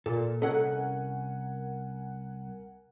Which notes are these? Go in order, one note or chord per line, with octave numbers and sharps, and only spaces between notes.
A#2 A4
C2 C#4 A4 A#4 D#5 F#5 G#5